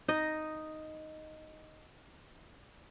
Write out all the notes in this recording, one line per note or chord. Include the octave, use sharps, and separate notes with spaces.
D#4 D#5